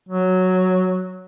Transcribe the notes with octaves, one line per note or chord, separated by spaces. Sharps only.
F#3